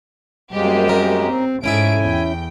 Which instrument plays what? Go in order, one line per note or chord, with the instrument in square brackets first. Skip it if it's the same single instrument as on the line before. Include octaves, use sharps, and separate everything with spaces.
[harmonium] F#2 G#3 [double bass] G3 [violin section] A#3 C4 G4
[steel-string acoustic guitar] C#4 D#4 A#4
[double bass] C4
[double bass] G#2 [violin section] A3 G#4 D7 [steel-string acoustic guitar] C#4 E4 E5 [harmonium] G#5
[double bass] E2 [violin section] G5